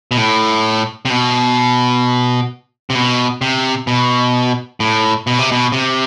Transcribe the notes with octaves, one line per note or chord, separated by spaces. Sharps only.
B2
A2
C3
B2
C3
B2
C3
B2
A2
B2
C3
B2
C3